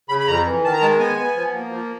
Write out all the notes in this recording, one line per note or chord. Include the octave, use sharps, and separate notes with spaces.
C#3 B5
B5
F2 A#5
E3
D#3 A5
A#5
G#3 A5
B3 G#5
B3
F3
A#3
F3